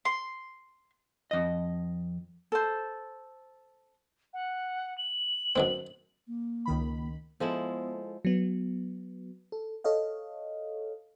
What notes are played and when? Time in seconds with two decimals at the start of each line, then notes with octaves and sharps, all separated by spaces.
0.05 C6
1.31 F2 D#5
2.52 A4 C5
4.33 F#5
4.97 F#7
5.56 F#2 D#3 C4
6.27 A#3
6.66 C#2 D#3 B5
7.40 F3 G#3 B3 E4 A4
8.25 F#3 B3
9.52 A4
9.84 A4 C#5 D#5 F5